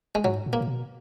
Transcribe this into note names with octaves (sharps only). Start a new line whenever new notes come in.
G#3
G#2 F#3
A#2
A#3
A#2
B2